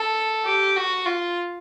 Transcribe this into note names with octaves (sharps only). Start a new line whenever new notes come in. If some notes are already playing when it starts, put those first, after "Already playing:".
Already playing: A4
G4
F#4
F4